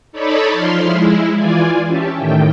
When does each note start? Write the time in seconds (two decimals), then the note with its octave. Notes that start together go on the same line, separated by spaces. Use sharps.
0.12 D#4 A4 C#5 D5 B5
0.51 F3 C6 F6
0.83 G#3 E4
1.35 E3 F4 D5 G#5
1.87 C#4 G4 E5 A5
2.16 A2 D#3 G5